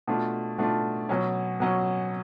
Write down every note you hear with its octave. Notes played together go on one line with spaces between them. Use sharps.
B2 A3 D4 F4
B2 A3 D4 F4
B2 F#3 C#4
B2 F#3 C#4